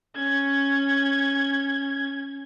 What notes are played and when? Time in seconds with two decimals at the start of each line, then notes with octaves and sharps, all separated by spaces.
0.15 C#4 G#6